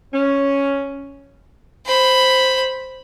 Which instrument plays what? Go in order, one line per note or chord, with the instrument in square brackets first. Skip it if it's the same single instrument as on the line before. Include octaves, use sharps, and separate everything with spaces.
[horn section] C#4
[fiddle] C5 B5